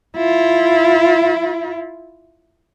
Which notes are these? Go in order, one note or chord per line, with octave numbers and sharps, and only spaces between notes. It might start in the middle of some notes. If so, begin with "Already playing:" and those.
E4 F4